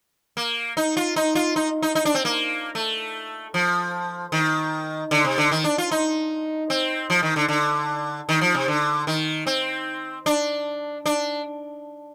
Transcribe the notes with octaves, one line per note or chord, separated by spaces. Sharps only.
A#3
D#4
F4
D#4
F4
D#4
D#4
D#4
D4
C4
A#3
A3
F3
D#3
D3
C3
D3
D#3
D4
F4
D#4
C4
F3
D#3
D3
D3
D#3
F3
C3
D3
D#3
C4
D4
D4